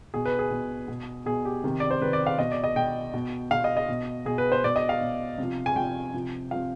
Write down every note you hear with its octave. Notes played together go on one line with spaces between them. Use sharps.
B2 G#4
B4
G#4
B2
B2
B2 G#4
G4
C3 D#3
D5
C5
C3 D#3 B4
D5
F5
B2 D#5
D5
D#5
B2 G5
B2
B2 F5
D#5
D#5
B2
B2 G#4
B4
C5
B2 D5
D#5
F5
B2
C3 F3
G#5
C3 F3 G5
C3 F3
C3 F3 F5